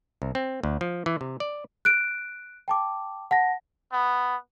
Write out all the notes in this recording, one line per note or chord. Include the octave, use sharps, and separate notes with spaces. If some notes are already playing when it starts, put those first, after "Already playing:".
C2
C4
D2
F3
E3
C3
D5
F#6 D7
G5 A5 D6
F#5 A5 A#6
B3